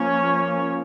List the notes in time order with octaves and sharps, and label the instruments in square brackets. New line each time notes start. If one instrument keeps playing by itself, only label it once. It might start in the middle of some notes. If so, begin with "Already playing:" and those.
Already playing: [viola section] F3 A#3 C#4 C#5